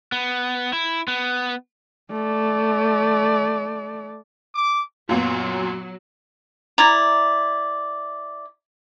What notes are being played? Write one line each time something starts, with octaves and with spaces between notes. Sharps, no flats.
B3
E4
B3
A3 D5
D6
F#2 A#2 F#3 B3 F4
E4 D5 A#5